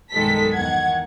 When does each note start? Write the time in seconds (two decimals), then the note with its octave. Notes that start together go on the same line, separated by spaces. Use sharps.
0.12 B1 G2 D#3 G#3 A4 B6
0.53 E2 D#3 F#5 G#6